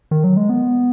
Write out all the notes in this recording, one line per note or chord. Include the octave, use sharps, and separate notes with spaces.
D#3
F#3
G#3
B3